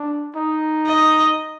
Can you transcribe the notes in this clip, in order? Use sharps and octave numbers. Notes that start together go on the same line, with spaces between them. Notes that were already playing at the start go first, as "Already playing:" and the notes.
Already playing: D4
D#4
D#5